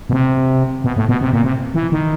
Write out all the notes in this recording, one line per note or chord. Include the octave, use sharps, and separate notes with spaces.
B2
C3
B2
A2
B2
C3
A#2
C3
E3
D#3